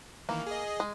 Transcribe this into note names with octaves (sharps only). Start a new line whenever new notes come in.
D#3 E3 A#3
G#4 D#5
G#3